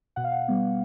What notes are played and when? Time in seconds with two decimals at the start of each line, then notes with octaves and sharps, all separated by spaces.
0.16 B2 F#5
0.24 F5
0.32 F#5
0.48 G3 B3